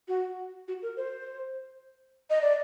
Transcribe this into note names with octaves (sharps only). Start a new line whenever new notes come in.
F#4
F#4
A#4
C5
D#5
D5